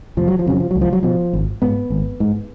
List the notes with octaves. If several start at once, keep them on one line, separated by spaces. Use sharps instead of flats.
F1 F3
F#3
F3
F2 C#3 F#3
F3
C#2 F#3
F3
F#3
B2 F3
G#1
G#2 B3
G#1
G#2